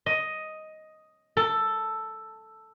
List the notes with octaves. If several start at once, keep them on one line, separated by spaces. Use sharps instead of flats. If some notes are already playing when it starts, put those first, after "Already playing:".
D#5
A4